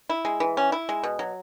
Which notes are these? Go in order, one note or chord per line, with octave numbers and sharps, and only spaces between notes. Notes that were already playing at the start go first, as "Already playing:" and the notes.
E4
G#3
E3
C#4
E4
G#3
B2
F#3